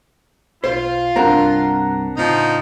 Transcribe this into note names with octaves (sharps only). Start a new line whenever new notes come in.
B1 F4 C5
C2 G2 C4 D4 A#4 F#5 A#5
A2 C#3 F3 D#4